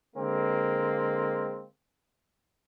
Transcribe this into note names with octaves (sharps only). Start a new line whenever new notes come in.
D3 G#3 A#3 C4